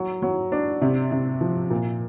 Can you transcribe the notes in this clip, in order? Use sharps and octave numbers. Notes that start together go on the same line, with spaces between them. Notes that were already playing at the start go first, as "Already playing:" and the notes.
Already playing: F#3
F#3
D4
C3
C3
F3
A#2